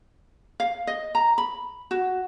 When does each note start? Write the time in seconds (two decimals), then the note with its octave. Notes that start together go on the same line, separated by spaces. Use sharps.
0.60 F5
0.87 D#5
1.15 A#5
1.38 B5
1.91 F#4